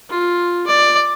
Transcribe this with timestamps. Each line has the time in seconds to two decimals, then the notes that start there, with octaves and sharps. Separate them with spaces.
0.10 F4
0.67 D5